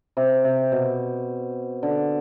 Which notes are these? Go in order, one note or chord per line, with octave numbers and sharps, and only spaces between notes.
C3
C3
B2
D3